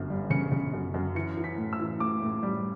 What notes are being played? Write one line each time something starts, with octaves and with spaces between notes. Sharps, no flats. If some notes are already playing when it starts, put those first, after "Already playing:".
Already playing: G1 F#2
G3
C#3 C#7
C#3
F#2
F#2
E3 C#7
E3
B6
A2
E6
E3
A2 D6
A2
G3